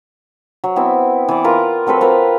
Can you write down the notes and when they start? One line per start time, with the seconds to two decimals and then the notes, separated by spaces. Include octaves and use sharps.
0.64 F#3
0.76 B3 C4 E4
1.29 E3 D5
1.44 F4 A#4 B4
1.87 F#3 C4 A4 B4
2.01 F4 A#4 B4 F5